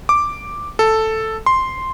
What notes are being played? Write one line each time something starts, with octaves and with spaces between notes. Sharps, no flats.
D6
A4
C6